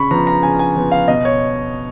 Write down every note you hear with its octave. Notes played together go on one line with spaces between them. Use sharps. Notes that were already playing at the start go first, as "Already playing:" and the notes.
Already playing: C#3 B5 C#6
F3 B3 A#5
A#5
C#3 G#5
G#5
F3 B3
F5
B2 D#5
C#5